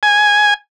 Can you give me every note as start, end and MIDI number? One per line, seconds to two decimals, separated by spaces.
0.03 0.54 80